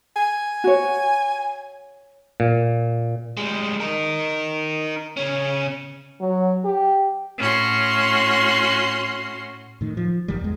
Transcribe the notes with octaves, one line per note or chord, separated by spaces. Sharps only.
G#5
F#4 C#5
A#2
G3 G#3
D#4 A#4
C#3 C#4
F#3
G4
A2 C#4 F#4 C6
A2 D#3
F3
G1 D#3 G3
E2 G#3